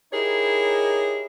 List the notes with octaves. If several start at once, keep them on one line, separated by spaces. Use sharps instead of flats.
D#4 E4 G4 G#4 A#4 C#5